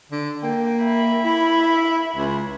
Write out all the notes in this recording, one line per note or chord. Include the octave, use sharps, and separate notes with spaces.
D3
A#3 G5
E5 B5
E4
C#2